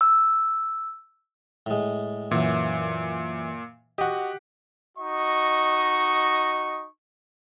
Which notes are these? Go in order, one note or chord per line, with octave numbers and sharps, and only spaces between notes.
E6
A2 G#3
F#2 A#2 E3
F#4 G4 D#5 F#5
D#4 F#4 D#5 C#6